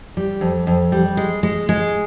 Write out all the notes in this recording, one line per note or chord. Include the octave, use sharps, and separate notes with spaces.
G3
F2
F2
G3
G#3
G#3
G#3